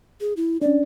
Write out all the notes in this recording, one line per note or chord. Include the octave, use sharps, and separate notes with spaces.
G#4
E4
C#4 D4 D5